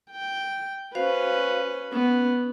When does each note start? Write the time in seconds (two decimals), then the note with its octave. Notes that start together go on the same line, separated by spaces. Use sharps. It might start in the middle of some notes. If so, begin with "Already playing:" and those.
0.11 G5
0.95 C#4 F#4 B4 C5 F5
1.93 B3 C#4